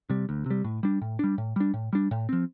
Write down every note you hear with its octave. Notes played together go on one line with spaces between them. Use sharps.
C3 G3
D2
C3 G3
A2
G3 D4
A2
G3 D4
A2
G3 D4
A2
G3 D4
A2
F3 C4